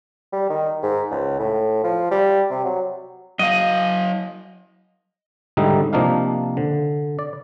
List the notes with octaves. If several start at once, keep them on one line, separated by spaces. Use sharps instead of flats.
G3
D#3
G#2
C#2
A2
F3
G3
C3
F#3
F#3 D#5 F5
G#2 D3 G3 D#4 E4
C3 F3 A#3 D4 D#4 F5
D3
D5